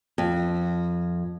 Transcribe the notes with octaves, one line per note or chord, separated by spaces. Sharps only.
F2